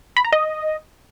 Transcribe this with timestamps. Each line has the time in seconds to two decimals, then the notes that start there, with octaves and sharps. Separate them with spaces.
0.17 B5
0.25 A#5
0.33 D#5